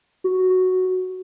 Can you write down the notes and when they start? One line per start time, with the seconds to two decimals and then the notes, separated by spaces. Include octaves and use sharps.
0.24 F#4